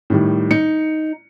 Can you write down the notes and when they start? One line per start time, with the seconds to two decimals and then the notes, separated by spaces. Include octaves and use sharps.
0.10 A2 D#3 G3
0.51 D#4 C#7